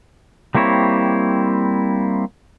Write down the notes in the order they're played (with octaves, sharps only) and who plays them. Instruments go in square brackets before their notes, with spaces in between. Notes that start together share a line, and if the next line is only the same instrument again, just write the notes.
[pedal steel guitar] G3 A#3 C4 E4 C#5